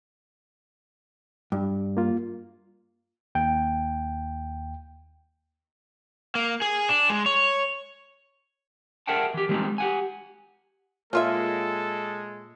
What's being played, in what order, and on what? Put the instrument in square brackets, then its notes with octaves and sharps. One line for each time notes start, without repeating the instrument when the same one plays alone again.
[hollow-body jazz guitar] G2
[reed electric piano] A#3 F4
[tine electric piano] D#2 G5
[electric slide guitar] A#3
G#4
D4
G#3
C#5
[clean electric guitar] G#4 A#4 E5 F#5 G5 A5
E3 G4
E3 G3 G#3 C4 C#4 D#4
G4 F#5 G#5
[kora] A#2 [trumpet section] G#3 [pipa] C#4 F4 E5 [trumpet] A4